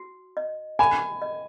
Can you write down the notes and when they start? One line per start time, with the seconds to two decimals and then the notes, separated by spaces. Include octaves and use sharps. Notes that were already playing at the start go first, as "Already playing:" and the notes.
Already playing: F#4
0.37 D#5
0.79 G#5 B5
1.22 D#5